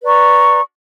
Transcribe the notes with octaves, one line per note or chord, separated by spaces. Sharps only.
B4 D5 A#5 C#6